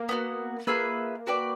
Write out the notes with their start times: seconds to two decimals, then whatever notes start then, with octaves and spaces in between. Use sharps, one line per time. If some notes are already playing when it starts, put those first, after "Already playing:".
Already playing: A#3
0.09 B3 D#4 F#4
0.67 A#3 F4 G#4 B4 E5
1.27 F#4 B4 D5 G5